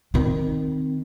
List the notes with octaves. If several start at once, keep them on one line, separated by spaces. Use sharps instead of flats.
D#3 C4